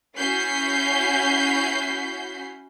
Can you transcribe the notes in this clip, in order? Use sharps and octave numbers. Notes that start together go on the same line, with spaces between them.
C#4 E4 F#4 G6 B6 C7